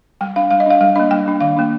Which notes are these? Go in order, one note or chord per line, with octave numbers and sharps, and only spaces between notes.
G3 G5
D4 F5
G3 F5
D#5
D4 F5
G3 F5
A#3 D4 D#5
G3 G5
A#3 D4
D#3 F5
A#3 D4